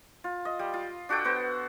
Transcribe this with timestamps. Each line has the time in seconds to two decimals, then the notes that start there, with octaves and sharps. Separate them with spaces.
0.24 F4
0.45 D#5
0.59 G3
0.74 F4
1.09 D4 F#4 A4 G5
1.24 B3 F#4 C5